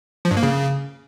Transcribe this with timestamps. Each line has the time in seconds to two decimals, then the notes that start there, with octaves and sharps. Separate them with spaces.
0.25 F3
0.31 G2
0.37 A#3
0.43 C#3